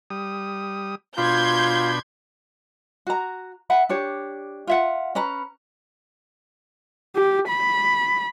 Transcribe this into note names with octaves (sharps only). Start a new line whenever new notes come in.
G3 D#6
B2 D4 F4 B5 C6 G6 G#6
F#4 A#5
E5 F#5 B5
D4 G4 C#5
F4 E5 F#5
C#4 B4 A#5 B5
G4
B5